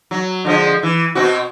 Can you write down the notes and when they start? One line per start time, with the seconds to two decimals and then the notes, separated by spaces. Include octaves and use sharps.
0.11 F#3
0.45 D3 F3 G#3
0.83 E3
1.15 B2 C4 F#4